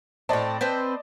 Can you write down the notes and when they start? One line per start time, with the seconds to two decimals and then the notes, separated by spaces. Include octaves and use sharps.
0.29 A2 C4 D5 D#5 A5
0.61 C4 B4 C5